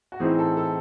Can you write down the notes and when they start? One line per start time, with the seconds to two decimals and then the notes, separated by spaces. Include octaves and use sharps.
0.12 F#4
0.20 A2 E3 C4 D#4 G#4
0.39 A4
0.57 A4